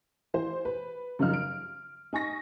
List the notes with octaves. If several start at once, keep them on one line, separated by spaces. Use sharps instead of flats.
E3 C5
B4
F#2 C#3 F3 D#4 F6
D7
D#4 G#5 C#6 A#6